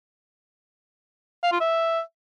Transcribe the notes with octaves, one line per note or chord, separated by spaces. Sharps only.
F5
F4
E5